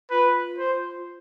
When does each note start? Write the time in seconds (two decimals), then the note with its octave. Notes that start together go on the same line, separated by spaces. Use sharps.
0.11 F4 B4
0.58 C5